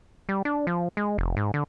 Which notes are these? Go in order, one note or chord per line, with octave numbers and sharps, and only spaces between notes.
G3
D4
F3
G#3
F1
G#2
D3